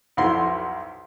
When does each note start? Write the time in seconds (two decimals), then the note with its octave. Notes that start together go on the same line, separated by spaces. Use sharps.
0.17 B1 F2 E4 C6